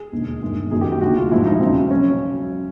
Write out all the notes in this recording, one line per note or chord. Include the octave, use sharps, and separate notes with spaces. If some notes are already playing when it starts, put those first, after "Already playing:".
Already playing: G#4
E1 D#2 D3
G1 G2 D#3 G#3
F#1 F#2 D#3 F#3 G#4
G4
G4
F1 D#2 D3 F#4
F4
A#1 G#2 F3 G#3 E4
D#4
E1 D2 C#3 F#3 C4
C#3 F#3 C#4